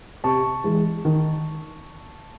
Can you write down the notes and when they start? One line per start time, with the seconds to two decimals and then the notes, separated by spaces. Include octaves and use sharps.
0.24 C3 A5 C#6
0.64 E3 G#3
1.05 D#3